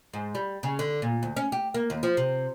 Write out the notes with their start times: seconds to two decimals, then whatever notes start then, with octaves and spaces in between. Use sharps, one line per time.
0.13 G#2
0.35 G3
0.63 C#3
0.79 D3
1.02 A#2
1.23 D2
1.36 C#4
1.52 G4
1.74 A#3
1.90 D#2
2.03 F3
2.17 C3